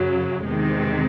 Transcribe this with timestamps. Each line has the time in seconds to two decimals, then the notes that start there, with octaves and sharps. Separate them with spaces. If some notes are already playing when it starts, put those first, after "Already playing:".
Already playing: F#2 C#3 F#3
0.45 E2 C3 D#3 G#3 C4